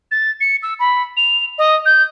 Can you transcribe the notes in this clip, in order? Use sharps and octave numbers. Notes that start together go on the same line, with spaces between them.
A6
C#7
E6
B5
F7
D#5
G6